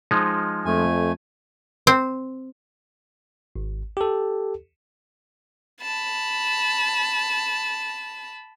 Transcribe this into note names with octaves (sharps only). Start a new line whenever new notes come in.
F3 G#3 D#4
F2 A3 G#5
C4
G#1
G4 A4
A5 B5